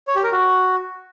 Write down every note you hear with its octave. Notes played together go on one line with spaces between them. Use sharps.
C#5
G4
A#4
F#4